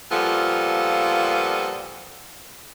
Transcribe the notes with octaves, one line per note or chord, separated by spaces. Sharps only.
A#2 F3 G3 B3 F4 A4